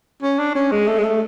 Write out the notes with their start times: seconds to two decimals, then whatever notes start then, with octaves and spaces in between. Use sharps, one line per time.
0.22 C#4
0.39 D4
0.55 C#4
0.71 G#3
0.87 A3
0.98 G#3
1.04 A3